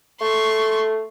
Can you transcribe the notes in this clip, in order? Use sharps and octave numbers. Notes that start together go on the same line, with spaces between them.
A3 C6 C#6